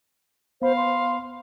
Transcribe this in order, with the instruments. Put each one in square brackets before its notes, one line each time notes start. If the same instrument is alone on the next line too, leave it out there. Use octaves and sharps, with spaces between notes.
[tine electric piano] B3 B5 [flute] C5 [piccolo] F5
[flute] C6